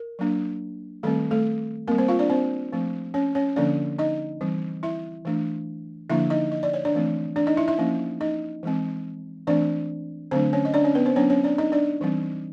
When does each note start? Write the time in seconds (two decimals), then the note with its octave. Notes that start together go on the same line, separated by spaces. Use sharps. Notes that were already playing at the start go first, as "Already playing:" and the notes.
Already playing: A#4
0.19 F#3 A#3 D4
1.03 D#3 G3 A3 C4 A4
1.31 A3 A4
1.88 A#3 C4 A#4
1.91 G3
1.98 C4 C5
2.08 F4 F5
2.19 D4 D5
2.30 C4 C5
2.72 F3 A3 C4
3.14 C#4 C#5
3.35 C#4 C#5
3.56 D3 F3 A#3 C#4 D4 D5
3.99 D#4 D#5
4.41 E3 G3 C4
4.83 E4 E5
5.25 E3 A3 D4
6.10 D3 F3 A#3 D4 E4 E5
6.30 D#4 D#5
6.52 D#5
6.63 D5
6.74 C#5
6.85 D4 D5
6.94 E3 A3 C4
7.36 D4 D5
7.47 D#4 D#5
7.57 E4 E5
7.68 E4 E5
7.79 F3 A#3 C#4
8.21 D#4 D#5
8.63 E3 G#3 C4
9.47 E3 A3 C4 D4 D5
10.31 D3 F#3 A3 C4 D4 C5
10.53 C#4 C#5
10.65 D#5
10.74 D4 D5
10.84 C#4 C#5
10.95 B3 B4
11.06 C4 C5
11.16 F#3 B3 C#4 D4 C#5
11.30 C#4 C#5
11.44 D4 D5
11.58 D#4 D#5
11.72 D4 D5
12.01 E3 G3 C4